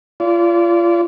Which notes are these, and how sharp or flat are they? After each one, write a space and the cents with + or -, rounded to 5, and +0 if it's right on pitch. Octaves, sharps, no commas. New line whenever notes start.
F4 -30 D5 -30